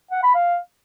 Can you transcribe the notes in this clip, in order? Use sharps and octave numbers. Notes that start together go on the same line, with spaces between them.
F#5
B5
F5